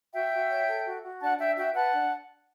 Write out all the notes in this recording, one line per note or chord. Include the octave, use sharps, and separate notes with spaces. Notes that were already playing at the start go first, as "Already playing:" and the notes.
F#4 E5 G5
F#4
C#5
A4
F#4
F#4
D4 F#5 A5
D4 E5 G5
F#4 E5 G5
B4 F#5 A5
D4